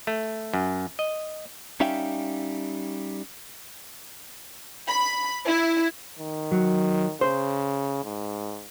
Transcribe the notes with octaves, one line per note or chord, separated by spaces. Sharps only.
A3
F#2
D#5
G3 C#4 D#4 E5 F5 G5
B5
E4
D#3
F#3
C#3 C5
G#2